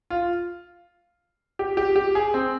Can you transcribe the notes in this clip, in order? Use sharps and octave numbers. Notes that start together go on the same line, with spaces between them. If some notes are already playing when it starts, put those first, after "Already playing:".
F4
G4
G4
G4
G#4
C4